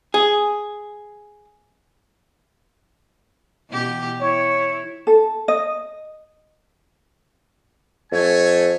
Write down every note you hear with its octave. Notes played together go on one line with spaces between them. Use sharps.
G#4
B2 E3 G4
E4 C#5
A4
D#5
F2 A3 C#5 G#5